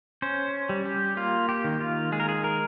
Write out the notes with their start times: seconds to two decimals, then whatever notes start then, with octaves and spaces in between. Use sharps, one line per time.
0.22 C#4 C5
0.69 G3
0.85 G4
1.17 A#3 F4
1.49 G4
1.64 D#3
1.81 F4
2.12 G#3 G#4
2.20 A#4
2.29 G#4
2.44 A#4